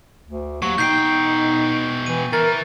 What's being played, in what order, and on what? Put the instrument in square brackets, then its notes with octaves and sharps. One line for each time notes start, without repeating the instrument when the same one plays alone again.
[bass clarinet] D2
[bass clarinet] D#2 [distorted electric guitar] F#3 [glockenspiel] C#6
[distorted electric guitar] B2 G5 [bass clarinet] D#4 [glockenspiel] G6 C7
[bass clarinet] E3 [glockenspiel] D#7
[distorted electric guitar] E3 [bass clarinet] A#4 [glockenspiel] A6